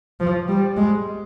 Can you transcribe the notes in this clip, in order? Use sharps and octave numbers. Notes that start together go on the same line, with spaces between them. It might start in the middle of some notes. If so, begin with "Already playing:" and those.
F3
G3
G#3